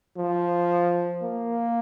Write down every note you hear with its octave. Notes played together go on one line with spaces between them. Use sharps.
F3
A#3